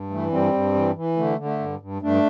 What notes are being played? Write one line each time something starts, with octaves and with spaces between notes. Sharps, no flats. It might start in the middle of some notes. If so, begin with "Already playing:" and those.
Already playing: G2
E3 A3
G2 G3 C4
G2
E3
E3
D3 A3
D3
A3
G2
G2
G2 A3 D4